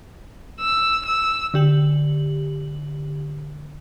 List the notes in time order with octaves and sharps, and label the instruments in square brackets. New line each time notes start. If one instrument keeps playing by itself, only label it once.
[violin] E6
E6
[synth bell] D3 G4 F#7